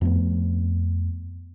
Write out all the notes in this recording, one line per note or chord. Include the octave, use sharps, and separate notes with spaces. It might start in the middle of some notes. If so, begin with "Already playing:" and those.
F2 A3 B3